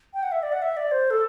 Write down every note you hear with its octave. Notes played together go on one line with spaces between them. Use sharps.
G5
F#5
E5
D5
F#5
E5
D5
C5
A4